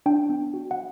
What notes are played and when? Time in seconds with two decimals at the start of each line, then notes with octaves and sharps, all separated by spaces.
0.06 D4 G5
0.29 B3
0.54 F#4
0.71 F#5